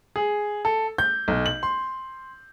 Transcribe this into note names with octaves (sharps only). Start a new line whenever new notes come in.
G#4
A4
G6
B1
F#7
C6